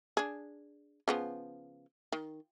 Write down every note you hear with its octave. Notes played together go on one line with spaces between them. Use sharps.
D4 G#4
C#3 F3 B3
D#3